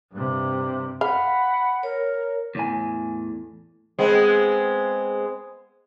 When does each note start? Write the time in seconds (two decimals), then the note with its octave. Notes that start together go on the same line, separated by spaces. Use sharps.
0.12 G2 C3
1.01 F5 F#5 B5
1.83 A#4 C#5
2.55 E2 A2 G#5
3.99 G#3 B3 C4